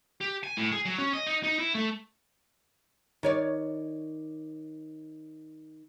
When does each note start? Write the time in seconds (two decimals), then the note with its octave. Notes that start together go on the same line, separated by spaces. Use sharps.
0.21 G4
0.44 G#5
0.58 A2
0.72 G#4
0.86 F#3
0.98 C#4
1.13 D#5
1.27 D#4
1.44 D#4
1.59 E4
1.75 A3
3.23 D#3 C#5 D5